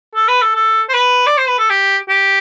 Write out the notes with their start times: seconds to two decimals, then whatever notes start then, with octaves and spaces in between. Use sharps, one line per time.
0.15 A4
0.28 B4
0.42 A4
0.55 A4
0.89 C5
0.93 B4
1.26 D5
1.37 C5
1.48 B4
1.59 A4
1.70 G4
2.09 G4